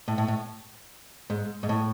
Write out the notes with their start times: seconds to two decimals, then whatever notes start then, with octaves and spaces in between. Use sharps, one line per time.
0.08 A2
0.18 A2
0.28 A2
1.30 G#2
1.63 G#2
1.69 A2